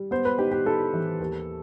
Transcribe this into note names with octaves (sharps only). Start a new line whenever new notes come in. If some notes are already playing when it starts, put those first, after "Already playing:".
Already playing: G3
B3 C5
B4
D#4 G4
G4
D#4 A4
E3
D#2